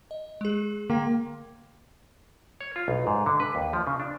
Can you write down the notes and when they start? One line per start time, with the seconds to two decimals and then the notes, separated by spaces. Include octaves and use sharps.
0.11 D#5
0.41 G#3 G#4
0.90 D3 A#3 G5
2.61 C#5
2.76 F4
2.88 B1
3.07 G#2
3.26 D3
3.40 B4
3.55 D#2
3.73 F3
3.87 C#3
4.00 D4